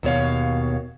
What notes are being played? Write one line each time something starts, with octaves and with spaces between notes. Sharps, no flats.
D#2 B2 C#5 F5